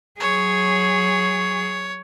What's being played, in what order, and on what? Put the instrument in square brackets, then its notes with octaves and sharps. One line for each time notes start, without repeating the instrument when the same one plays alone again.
[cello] F#3 G#4 [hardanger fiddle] C#5